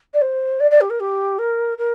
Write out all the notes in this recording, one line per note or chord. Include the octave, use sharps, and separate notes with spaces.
D5
C5
D5
D5
G4
A#4
G4
A#4
A#4